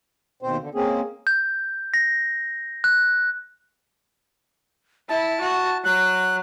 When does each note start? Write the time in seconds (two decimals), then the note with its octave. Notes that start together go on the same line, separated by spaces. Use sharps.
0.42 D#2 B2 C4 C5
0.61 D3
0.75 G#3 A#3 C4 C#4 G#4
1.27 G6
1.94 A#6
2.84 F#6
5.09 E4 A5
5.41 F#4
5.84 F#3 F#6